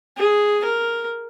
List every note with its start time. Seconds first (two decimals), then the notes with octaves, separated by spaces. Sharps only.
0.18 G#4
0.65 A#4